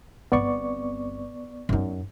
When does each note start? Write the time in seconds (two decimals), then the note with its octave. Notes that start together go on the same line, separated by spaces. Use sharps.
0.32 G1 B3 C4 D5 C#6
1.69 F#2 D#4